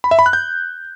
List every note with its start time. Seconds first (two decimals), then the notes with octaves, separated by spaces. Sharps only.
0.04 B5
0.11 E5
0.19 B5
0.26 F#6
0.33 G6